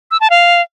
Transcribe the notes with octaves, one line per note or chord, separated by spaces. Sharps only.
E6
A5
F5